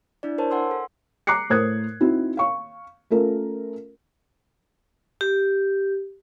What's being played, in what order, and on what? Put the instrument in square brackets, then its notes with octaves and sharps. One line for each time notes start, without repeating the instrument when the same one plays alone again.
[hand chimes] D4 E4 D5
A#4 C5 C#5 A5
F#5 G#5 C6 E6
A4
[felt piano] A#5 D6 F#6 C7 C#7
A2 A#4 C5 D#6 F#6 G#6
C4 D#4 E4 F#4
F5 C#6
A3 C#4 F4 A4 A#4
[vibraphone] G4